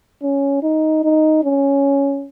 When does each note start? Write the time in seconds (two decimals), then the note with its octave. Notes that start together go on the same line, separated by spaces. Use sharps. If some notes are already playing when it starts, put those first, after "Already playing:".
0.23 C#4
0.63 D#4
1.04 D#4
1.44 C#4